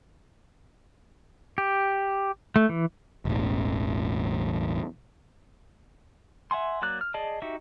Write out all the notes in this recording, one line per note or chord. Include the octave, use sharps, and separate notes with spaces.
G4
A3
E3
E1 A1
E5 F#5 G#5 C6
F#3 A#3 D5 F#6
F6
G#4 D5 D#5 A5
D#4 F#4 G4 E5